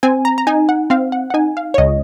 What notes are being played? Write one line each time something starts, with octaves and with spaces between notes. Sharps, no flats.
C4 G#5
A#5
A#5
D#4 G#5
F#5
C4 F5
F#5
F#5
D#4 G#5
F5
C#5
C#2 D#5